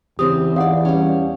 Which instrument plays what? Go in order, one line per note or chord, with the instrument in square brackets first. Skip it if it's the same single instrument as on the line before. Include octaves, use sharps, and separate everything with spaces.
[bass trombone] E2 [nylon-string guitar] C#3 C4 G4 [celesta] D#6
[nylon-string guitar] D#4 D5 [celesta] F5 F#5
[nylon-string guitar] G3 C#4